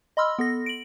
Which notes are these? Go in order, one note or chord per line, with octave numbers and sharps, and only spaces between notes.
D#5 B5 C6 E6 F6
B3 A4 A#6
D7 F#7